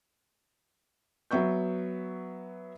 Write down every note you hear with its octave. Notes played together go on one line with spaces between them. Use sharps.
F#3 B3 E5 C#6 G6